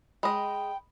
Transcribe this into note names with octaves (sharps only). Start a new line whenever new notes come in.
G#3 D#5 G5 B5